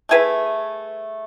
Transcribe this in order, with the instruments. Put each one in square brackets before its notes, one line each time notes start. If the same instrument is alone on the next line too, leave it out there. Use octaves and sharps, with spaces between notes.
[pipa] A3 E4 G#4 B4